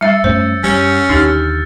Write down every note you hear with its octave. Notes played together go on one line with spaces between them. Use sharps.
G3 E5 E6 A6 C#7
F#2 A3 C#4 C5 G6 C#7
F#2 G3 C#4
D#2 D3 D#4 G4 F6 A6